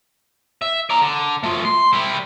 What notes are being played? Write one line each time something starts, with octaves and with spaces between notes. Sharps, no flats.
E5
D5 A#5
D3
A3 F4
C6
G3 E4